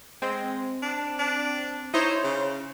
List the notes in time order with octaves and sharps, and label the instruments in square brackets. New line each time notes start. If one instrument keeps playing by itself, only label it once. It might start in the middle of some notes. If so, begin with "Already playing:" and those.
[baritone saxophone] G#3 [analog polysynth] C4
[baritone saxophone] D4
D4
[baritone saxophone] D#4 [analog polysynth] E4 C5 C#5
[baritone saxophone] C#3